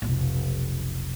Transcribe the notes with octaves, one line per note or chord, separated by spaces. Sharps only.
F1 B1